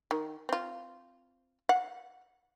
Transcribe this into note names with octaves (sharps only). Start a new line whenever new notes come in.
D#3
C4 F4
F5 F#5